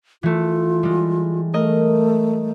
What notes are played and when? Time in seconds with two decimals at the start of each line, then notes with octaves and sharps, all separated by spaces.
0.23 E3 A3 F4
0.83 G3 G#3
1.54 A3 A#4 D#5